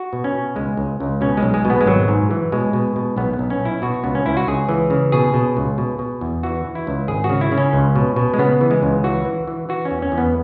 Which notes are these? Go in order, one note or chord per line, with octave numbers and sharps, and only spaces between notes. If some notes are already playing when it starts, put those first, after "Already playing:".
Already playing: F#4
B2
C#4
B2
C#2 G#3
C#2
C#2
B2 C#4
G#3
B1
G#3
B2
B3
G#3
G#1 F#3
G#2
E3
B2 G#3
B2
B2
B1 B3
B3
B1
C#4
B1
E4
B2 F#4
C#2 B3
C#4
C#2 E4
F#4
C#2 G#4
E3
C#3
B2 G#4
B2
C#2
B2
B2
E2
E3 F#4
E3
E4
C#2
G#1 G#4
F#4
C#3
E4
C#3
C#4
C#2
B2
B2
G#3
C#3 B3
E3
G#3
C#2
E3 F#4
E3
E3
E3 F#4
C#4
E2
C#4
E2
B3